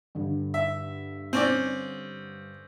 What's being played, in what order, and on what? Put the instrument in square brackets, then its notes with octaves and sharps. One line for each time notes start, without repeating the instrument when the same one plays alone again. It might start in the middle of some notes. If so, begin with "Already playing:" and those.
[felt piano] G2 D3
[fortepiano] E5
C4 C#4 D5